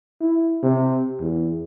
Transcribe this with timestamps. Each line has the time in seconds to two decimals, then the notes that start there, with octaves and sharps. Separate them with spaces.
0.21 E4
0.63 C3
1.20 E2